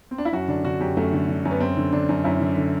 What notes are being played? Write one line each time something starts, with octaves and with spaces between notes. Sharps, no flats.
C4
D4
E4
F#2 F#4
D3 D4
D3 F#4
F#2 G4
F#2 A3
D3
D3
F#2
B3
F#2 C4
D3
D3 D4
F#2
F#2 E4
D3
D3